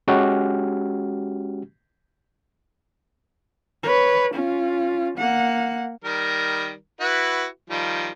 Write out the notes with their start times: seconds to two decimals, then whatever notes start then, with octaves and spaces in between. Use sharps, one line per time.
0.08 G#3 C#4 F#4 G4 F6
3.83 B4 C#5
4.34 C#4 F4
5.18 A#3 F#5
6.04 D#3 G3 A#4
7.00 E4 F#4 B4
7.70 D#3 F3 G3